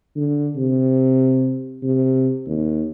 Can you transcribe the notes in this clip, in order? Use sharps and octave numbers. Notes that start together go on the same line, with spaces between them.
D3
C3
C3
D#2